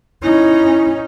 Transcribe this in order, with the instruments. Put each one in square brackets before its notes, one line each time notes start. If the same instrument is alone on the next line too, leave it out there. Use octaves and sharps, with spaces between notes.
[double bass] C#4 D#4 [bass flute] E4